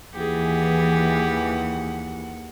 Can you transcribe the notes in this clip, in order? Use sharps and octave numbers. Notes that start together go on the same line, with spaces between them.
D#2 E3 G4 G#4 F#5